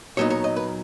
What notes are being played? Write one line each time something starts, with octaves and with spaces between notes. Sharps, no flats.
A#2 F#3 B3 D#4 C#5
C#5
D#5
B4